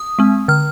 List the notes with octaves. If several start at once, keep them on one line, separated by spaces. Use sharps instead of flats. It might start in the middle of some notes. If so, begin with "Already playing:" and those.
Already playing: D#6
G#3 C4
D3 F6